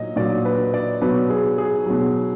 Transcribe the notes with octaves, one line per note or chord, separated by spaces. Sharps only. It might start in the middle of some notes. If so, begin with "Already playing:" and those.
Already playing: A#2 F#3 D#5
A#2 F#3 D5
B4
D5
B2 F#3 B4
G#4
G#4
B2 F#3